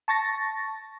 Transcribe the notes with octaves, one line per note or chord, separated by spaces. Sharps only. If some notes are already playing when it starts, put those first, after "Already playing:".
A5 C#6 A6 A#6